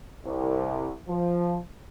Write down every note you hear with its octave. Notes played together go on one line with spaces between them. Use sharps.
C2
F3